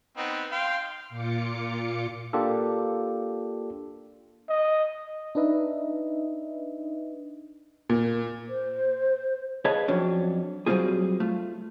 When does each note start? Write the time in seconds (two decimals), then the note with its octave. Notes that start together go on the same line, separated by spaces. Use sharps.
0.17 B3 C4 D#4
0.52 F5 G5 C6
1.10 A#2 F4 D6 C#7
2.33 A#3 D4 F4 G4 A4
4.49 D#5
5.35 D4 D#4 B4 D#5 E5
7.89 A#2
8.49 C5
9.65 G#4 B4 C#5 D#5 F5 A5
9.88 F2 F#3 C#4 D4
10.66 F#3 G3 B3 C4 F4 G#4
11.20 A3 F4